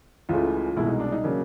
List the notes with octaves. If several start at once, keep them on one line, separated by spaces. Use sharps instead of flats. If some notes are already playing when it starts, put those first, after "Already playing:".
C#2 C#3 E3 A3 F4
C2 B2 G#3 E4
D#4
D4
D#4
C#3 F#3 A#3 D4